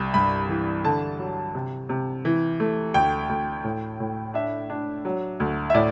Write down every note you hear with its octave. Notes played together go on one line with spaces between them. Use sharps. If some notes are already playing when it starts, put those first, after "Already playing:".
Already playing: C2
G2 B5
E3
D3 A5
F#3
C3
C3
E3
A3
D2 G5
D2
A2
A2
D4 E5
D4
F#3
D2
E5
A2 D5